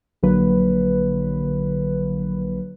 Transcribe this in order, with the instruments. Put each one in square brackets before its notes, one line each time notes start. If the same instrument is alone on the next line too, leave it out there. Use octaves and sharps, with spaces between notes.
[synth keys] A#1 D3 F#3 A#3 B4